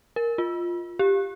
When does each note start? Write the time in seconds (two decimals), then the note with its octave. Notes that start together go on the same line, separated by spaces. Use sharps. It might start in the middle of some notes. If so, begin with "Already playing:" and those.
0.16 A#4
0.38 F4
0.99 G4